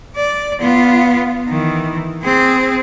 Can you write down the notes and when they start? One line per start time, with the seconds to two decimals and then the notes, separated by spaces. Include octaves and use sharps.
0.16 D5
0.60 B3 F4
1.48 D#3 E3
2.23 C4 G#4